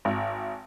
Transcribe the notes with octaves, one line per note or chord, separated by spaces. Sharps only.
G#1